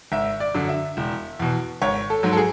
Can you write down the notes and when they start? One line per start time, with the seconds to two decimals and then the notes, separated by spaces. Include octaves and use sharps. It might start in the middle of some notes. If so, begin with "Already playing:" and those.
0.12 G#1 E5
0.40 D5
0.54 F#2 D3 F#3
0.69 E5
0.97 E1
1.39 E2 B2
1.82 G#1 C#5
2.10 A4
2.23 G#2 F#3
2.32 A4
2.37 G#4